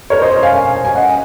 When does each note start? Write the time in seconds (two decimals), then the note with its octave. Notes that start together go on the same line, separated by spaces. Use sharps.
0.10 A#4 C#5
0.22 C5 D#5
0.43 F5 G#5
0.53 F5 G#5
0.85 G#5
0.95 D#5 F#5